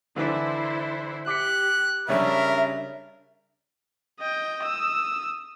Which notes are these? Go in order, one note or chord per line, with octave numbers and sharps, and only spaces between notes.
D3 E3 D4 E4 C5
G4 D6 F#6 B6 C#7
C#3 G3 C#4 D4 A#4 E5
D#5 G5
D#6 E6